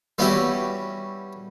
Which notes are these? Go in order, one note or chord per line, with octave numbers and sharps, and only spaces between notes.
G3 B3 C#4 E4 F#4 G4